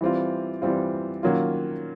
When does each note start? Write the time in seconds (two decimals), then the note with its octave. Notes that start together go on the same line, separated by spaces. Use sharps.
0.01 E3 G3 C4 F4
0.62 E3 G3 C4 F4
1.23 D#3 F#3 A#3 C#4 F4